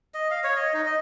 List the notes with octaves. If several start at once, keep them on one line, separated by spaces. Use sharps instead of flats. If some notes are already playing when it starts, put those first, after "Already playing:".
D#5
F5
C#5
D#5
D#4
D#5